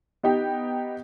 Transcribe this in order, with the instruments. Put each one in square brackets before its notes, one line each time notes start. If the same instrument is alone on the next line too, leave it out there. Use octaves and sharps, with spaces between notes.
[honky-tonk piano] B3 D#4 G4 G5